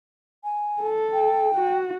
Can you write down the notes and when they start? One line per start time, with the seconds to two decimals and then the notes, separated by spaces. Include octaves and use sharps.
0.44 G#5
0.82 A4
1.13 G5
1.55 F#4